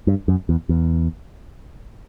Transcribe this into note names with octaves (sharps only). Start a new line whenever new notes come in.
G2
F#2
E2
E2